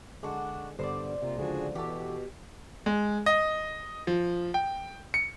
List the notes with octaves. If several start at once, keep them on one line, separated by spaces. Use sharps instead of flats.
D3 G#3 D4 F#4
G2 D3 B3 C5 D5
C3 A#3 F4
C#2 D3 F3 D4 F#4 G#4
B2 E3 F#4 G4 A4
G#3
D#5
F3
G5
C#7